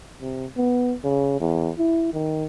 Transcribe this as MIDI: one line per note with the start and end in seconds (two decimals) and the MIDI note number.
0.21 0.46 48
0.57 0.95 59
1.04 1.36 49
1.40 1.70 40
1.78 2.09 64
2.13 2.46 51